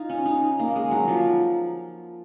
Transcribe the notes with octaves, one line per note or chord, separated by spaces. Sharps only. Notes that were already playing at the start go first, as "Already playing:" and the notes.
Already playing: D#4 F4
C#4
D#4
A#3
G#3
F#3
F3